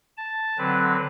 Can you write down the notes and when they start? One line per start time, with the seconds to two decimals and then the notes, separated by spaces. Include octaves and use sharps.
0.18 A5
0.58 D3 F#3 C4 B4